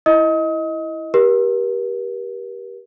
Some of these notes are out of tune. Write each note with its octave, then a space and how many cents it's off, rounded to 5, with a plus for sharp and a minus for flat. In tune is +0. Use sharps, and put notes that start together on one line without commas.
E4 +0 D#5 +15 D#6 +35
G4 -5 A#4 +40